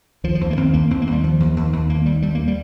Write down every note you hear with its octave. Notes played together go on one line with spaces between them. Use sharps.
D#2 F3
F3
D#2
A#3
D#2 C4
D#2 A#3
D#2 C4
A#3
D#2
G3
D#2 F3
D#2
D#2
D#2
D#2 A#3
D#2 G3
D#2 G3
A#3
G3